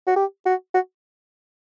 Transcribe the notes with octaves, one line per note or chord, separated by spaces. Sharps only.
F#4
G4
F#4
F#4